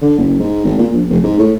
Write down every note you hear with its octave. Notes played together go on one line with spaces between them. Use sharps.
D3
F#1
G#2
G#1
A#2
A#1
F1
G#2
A2